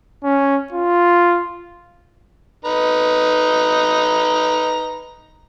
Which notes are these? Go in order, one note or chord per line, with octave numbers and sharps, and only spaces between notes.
C#4
F4
D#4 B4 A#5